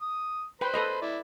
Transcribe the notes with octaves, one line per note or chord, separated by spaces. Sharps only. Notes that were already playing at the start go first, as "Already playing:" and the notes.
D#6
B4 C5 G5 B5 C6
A4 B4 D#5
E4 D5